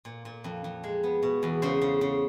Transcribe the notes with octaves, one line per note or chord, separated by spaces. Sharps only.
A#2
A#2
F2
F2
G#3
B3
B2
E2
C#3 C5
C#3
C#3